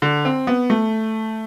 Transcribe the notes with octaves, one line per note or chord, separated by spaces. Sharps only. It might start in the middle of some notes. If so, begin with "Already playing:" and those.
D3
C4
B3
A3